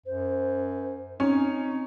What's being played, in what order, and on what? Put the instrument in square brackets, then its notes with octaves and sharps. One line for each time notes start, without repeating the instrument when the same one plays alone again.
[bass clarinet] F#2 [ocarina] C5
[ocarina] C4 [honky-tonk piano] C#4 [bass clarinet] D#4